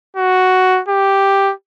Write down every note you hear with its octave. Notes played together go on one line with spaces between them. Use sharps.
F#4
G4